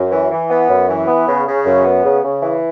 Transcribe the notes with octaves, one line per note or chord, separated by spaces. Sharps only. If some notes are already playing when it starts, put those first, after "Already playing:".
Already playing: F#2
E3
E3
B3
F#2
E3
B3
C#3
C#3
F#2
B3
C#3
C#3
E3